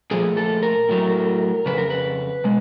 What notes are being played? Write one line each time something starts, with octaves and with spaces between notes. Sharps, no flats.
A#2 F3 A3 G#4
A4
A#4
A2 F#3 A3
F2 C#3 B4
A#4
B4
B2 G#3